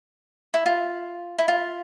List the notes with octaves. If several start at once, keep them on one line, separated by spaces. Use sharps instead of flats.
E4
F4
E4
F4